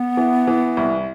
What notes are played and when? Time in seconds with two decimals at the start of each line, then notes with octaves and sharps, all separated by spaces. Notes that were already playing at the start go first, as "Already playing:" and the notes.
Already playing: B3
0.17 E3
0.47 E3
0.77 C2